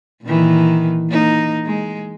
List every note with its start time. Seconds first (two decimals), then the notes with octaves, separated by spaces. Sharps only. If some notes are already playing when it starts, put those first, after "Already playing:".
0.23 A#2 D#3 E3
1.10 A#3 D#4
1.66 G#3